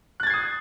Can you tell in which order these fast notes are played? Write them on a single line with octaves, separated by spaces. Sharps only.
F#6 A6 G#6 C7 D#6